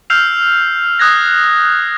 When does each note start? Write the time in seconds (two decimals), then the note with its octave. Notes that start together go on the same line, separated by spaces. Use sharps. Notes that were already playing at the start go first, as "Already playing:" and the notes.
0.10 E6 F6 G6 C7 F7
0.99 D#6 F#6 G#6 A#6